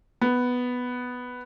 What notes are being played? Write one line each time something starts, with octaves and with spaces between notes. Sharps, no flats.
B3